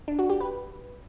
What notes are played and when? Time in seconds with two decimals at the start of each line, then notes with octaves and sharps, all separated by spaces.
0.08 D4
0.19 F#4
0.30 G4
0.41 B4